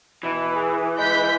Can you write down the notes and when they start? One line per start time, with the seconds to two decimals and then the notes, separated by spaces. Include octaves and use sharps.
0.23 B2 E3
0.55 G#4
0.98 G#3 G6 B6